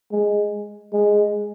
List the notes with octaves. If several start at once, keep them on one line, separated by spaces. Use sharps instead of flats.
G#3
G#3